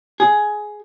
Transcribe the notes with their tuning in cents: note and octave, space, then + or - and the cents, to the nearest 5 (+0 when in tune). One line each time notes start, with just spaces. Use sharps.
G#4 +10